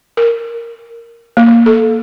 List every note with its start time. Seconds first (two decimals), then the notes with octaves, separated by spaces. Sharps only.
0.17 A#4
1.37 A#3
1.66 A4